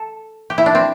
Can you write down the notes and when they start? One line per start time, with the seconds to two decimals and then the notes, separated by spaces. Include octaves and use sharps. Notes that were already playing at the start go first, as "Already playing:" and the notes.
Already playing: A4
0.50 G4
0.58 E4
0.66 D4
0.75 C4